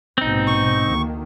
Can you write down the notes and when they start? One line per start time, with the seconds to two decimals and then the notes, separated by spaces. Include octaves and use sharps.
0.18 A#1 G#2 B2 C4 D#4
0.47 C#6
0.86 D2 D#3 A#3